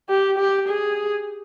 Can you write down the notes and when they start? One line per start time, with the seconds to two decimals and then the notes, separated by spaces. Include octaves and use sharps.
0.09 G4
0.38 G4
0.68 G#4